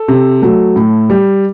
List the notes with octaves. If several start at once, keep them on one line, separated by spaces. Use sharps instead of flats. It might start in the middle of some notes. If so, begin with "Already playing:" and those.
Already playing: A4
C3
F#3 A3
A2
G3